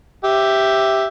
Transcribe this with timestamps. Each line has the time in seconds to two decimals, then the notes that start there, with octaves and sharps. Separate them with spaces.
0.24 G4 E5